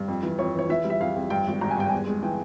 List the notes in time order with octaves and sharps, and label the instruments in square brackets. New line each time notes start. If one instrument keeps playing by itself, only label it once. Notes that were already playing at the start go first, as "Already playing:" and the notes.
Already playing: [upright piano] G2
F2
E3
F2 C#5
E3 C#5
E3 E5
G3
E5
F2 F5
F2
G2 G5
G#1
G#1 A#5
G#5
G2 G5
E2 G#5
G#3
E3 G5